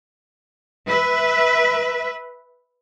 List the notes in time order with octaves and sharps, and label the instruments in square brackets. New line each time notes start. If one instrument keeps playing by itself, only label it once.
[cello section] B4 E5